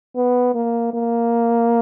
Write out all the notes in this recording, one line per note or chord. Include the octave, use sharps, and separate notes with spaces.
B3
A#3
A#3